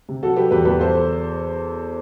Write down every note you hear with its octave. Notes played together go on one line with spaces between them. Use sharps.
C3
F#3 F#4 A4
F#3 G4 B4
E2 G4 B4
E2 G4 B4
A4 C5